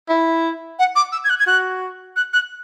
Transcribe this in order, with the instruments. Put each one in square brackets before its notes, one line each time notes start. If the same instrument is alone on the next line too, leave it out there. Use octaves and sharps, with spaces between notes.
[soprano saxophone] E4
[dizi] F#5
D6
E6
G#6
F#6
G#6
[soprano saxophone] F#4 [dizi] F#6
[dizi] F#6
F#6